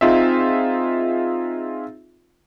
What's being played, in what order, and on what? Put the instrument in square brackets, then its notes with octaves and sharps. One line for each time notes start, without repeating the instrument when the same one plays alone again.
[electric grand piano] C4 D#4 F4 G#4 D#5 E5